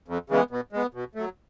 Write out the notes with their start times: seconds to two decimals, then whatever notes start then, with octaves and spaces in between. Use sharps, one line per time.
0.08 F2
0.30 C#3 E3 G#3 B3
0.51 B2
0.72 G#3 B3
0.94 B2
1.15 F#3 A3